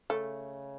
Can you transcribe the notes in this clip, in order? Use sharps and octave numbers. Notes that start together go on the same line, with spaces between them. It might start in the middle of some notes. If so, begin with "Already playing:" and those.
C#3 A3